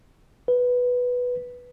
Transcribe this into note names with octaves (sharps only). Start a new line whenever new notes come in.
B4